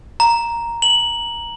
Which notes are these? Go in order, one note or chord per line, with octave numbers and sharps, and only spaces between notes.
A#5
F#7